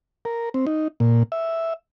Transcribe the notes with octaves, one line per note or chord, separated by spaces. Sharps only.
A#4
C4
D#4
A#2
E5